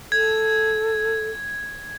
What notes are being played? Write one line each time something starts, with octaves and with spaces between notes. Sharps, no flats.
A4 G#6